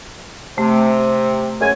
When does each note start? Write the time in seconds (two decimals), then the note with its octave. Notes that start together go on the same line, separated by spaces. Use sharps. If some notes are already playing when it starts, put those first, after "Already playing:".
0.58 C3 A3
1.61 F#2 G#3 G#5